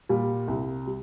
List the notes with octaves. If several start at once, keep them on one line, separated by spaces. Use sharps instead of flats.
A#2 G3
C2
G3